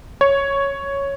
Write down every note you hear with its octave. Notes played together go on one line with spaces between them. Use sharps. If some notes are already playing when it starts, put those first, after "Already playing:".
C#5